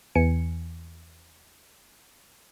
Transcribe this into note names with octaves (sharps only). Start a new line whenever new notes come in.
E2 E3 G#5 C#7